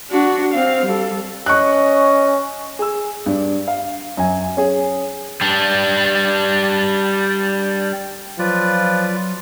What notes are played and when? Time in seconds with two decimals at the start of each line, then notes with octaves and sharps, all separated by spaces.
0.11 D4 F#4
0.53 C4 F5
0.86 G3 A4
1.46 C#4 D#5 C#6 F#6
2.79 G#4 E6
3.26 G2 D4
3.68 F5
4.17 F#2 G#5
4.57 C#4 G#4
5.41 G3 D4
8.39 F3 F#3 F4 B4 D5